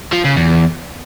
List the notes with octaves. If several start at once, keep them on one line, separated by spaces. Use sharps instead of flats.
F3
C#3
E2